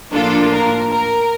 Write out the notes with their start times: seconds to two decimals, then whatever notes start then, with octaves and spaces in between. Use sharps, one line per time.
0.12 A2 F3 A#3 D4 F4 A4
0.51 A#4
0.91 A#4